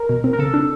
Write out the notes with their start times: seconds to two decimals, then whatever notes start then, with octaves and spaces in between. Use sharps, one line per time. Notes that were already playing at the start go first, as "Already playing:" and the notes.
Already playing: A#4
0.09 B2
0.24 C4
0.33 A#4
0.39 C#3 A4
0.54 D4